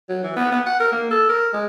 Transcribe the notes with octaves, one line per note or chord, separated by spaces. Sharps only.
F#3
E3
B3
B3
F#5
A#4
A#3
A4
A#4
G#3